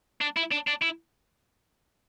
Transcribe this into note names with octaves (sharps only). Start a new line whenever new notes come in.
D4
E4
D4
D4
E4